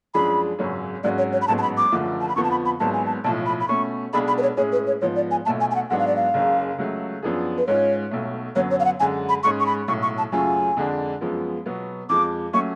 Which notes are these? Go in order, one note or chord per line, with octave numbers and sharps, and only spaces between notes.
F#2 F3 G#3 D4 G#4 B5
G#1 F#2 C#3 F#3 C#4
G#1 G#2 F#3 C#4 F#4 D5
C#5
C#5
B5
A1 G#2 F#3 B3 A5
A5
B5
D6
F#1 F#2 D3 F3 A3
A5
B5
F2 D3 F3 B3 C#6
A5
B5
B5
G#1 G#2 F#3 B3 A5
G#5
A5
B1 A2 F3 A5
B5
B5
B2 A3 C#4 C#6
B1 B2 G#3 D4 G#4 B5
B5
B4
C#5
A2 G#3 C#4 G#4 C#5
B4
C#5
G#2 F3 B3 C#5
D5
G#5
B1 B2 A3 A5
G#5
G#5
F#5
G#2 F#3 B3 D4 F#5
F5
D5
F5
F#1 F#2 C#3
C#2 C#3 F#3 A3
F#2 F3 B3 D4 G#4
B4
G#2 G#3 C#4 F4 C#5
B1 B2 A3
F#2 D3 F#3 B3 C#5
C#5
F5
F#5
F#2 D3 G#3 G#5
B5
G#2 G#3 C#4 G#4 C#6
C#6
B5
B1 A2 F#3 C#6
C#6
A5
F#2 C#3 F#3 A3 F4 G#5
F2 D3 G#3 D4
F#2 F3 G#3 B3
B2 F#3 B3
F2 F3 G#3 D6
F#3 A3 C#4 C#6